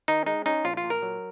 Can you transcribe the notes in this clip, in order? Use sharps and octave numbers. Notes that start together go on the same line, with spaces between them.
D#3 D#4
G#3 D#4
C#4 D#4
A#1 F4
F4
A#2
A#4
F#3